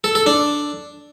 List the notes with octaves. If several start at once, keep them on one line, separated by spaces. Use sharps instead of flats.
A4
A4
D4